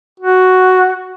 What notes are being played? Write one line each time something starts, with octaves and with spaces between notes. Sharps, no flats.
F#4